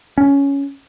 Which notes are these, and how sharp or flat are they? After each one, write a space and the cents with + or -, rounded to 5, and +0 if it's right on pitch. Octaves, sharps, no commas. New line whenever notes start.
C#4 +10